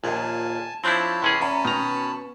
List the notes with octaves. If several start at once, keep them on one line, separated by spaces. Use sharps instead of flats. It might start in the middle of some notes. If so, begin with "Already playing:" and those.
A#1 D#2 A#2 G#5 A5
F3 C4 D4 E4 C#5 A5 B5
E2 C3 C#4 G#4
E2 C#4 A#5
B2 D#3 A#5